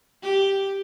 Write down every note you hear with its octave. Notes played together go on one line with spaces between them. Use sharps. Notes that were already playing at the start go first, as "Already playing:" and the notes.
G4